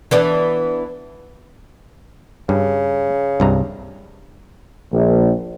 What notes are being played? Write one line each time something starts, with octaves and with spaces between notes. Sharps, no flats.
E3 B3 D4
G2 C#3
C2 G2 A#5
A#1